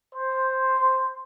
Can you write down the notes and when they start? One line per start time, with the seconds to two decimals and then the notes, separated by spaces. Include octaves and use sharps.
0.14 C5